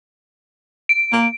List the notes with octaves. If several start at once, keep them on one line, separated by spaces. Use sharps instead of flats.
D7
A#3